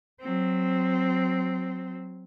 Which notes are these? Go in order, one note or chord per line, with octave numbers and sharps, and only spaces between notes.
F#3 C4